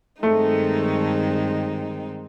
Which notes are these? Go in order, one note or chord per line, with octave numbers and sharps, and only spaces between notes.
G2 D#3 G#3 A3 C4 D#4